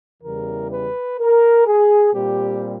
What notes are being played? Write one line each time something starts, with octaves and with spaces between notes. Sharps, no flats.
E2 C#3 E3 G3 A#4
B4
A#4
G#4
A#2 G3 C4 G4